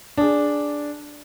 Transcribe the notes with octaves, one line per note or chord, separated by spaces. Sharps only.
D4 G#4